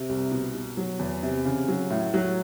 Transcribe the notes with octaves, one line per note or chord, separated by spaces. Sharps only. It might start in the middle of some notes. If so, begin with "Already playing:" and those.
Already playing: C3
C2
B2
B2
F#3
E2
C3
C#3
F#3
A2
F#3